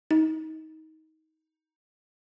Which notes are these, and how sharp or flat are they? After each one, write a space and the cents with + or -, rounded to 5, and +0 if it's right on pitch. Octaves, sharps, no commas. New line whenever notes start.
D#4 +25